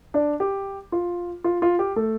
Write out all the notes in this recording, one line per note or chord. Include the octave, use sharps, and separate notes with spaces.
D4 D5
G4
F4
F4
F4
G4
A3 A4